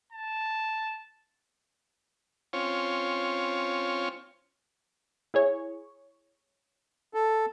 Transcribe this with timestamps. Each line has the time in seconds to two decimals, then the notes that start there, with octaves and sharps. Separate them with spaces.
0.13 A5
2.53 C4 C#4 F4 C#5
5.34 E4 G#4 C#5
7.14 A4